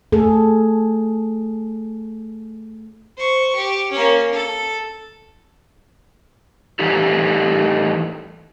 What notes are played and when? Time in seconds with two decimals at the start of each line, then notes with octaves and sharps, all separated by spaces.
0.12 A3 G#4 A4
3.17 C5 C#6
3.56 G4
3.92 A#3 C#4
4.33 A4
6.79 A2 E3 G3 D#4 G4 A4